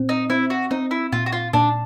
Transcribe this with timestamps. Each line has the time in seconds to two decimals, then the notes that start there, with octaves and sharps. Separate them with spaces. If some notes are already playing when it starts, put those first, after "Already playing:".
Already playing: A#2 C4
0.09 D#4
0.30 C4 E4
0.50 F#4
0.71 C4 D#4
0.91 E4
1.12 A#2 F4
1.26 F#4
1.32 F4
1.53 A#2 D4